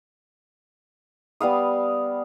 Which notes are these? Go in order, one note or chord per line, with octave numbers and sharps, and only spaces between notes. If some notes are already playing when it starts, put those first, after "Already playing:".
G3 B3 F5 D#6